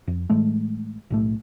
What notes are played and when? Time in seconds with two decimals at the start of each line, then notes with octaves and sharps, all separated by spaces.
0.08 F2
0.30 A2 E3 G#3 A3
1.10 B1 A2 A3